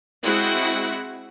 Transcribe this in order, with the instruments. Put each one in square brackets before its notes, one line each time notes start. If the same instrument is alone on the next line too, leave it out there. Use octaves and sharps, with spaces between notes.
[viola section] G#3 C4 E4 F#4 F#5